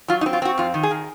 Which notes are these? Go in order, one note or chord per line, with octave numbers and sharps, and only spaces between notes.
F#3 F4
D#4
C4
F4
C4 F#4
F2 F4
D#3
G#4
D#3